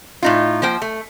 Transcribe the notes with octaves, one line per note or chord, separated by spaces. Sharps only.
A2 D#4 F4
F3 A#3 C5 G5
A3